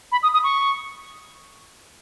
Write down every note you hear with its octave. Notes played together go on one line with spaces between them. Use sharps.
B5
D#6
D#6
C#6